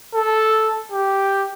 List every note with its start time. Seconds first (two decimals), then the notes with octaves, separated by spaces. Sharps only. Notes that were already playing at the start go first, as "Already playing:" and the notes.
0.14 A4
0.92 G4